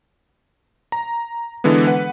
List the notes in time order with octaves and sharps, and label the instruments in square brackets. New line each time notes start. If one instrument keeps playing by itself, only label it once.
[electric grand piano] A#5
D3 E3 G#3 B3
B4 F#5